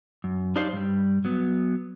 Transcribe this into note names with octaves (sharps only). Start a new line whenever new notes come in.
F#2
D4 D#4 G4 C5 C#5 F5
G2 G3
F#3 B3